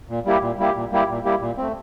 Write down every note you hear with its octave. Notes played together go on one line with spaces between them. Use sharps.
A#2
G3 A#3 E4 G4
A#2
G3 A#3 E4 G4
A#2
G3 A#3 E4 G4
A#2
G3 A#3 E4 G4
A#2
A3 C4